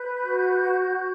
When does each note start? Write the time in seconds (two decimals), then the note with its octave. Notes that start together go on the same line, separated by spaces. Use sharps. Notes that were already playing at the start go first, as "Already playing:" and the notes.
Already playing: B4 G6
0.21 F#4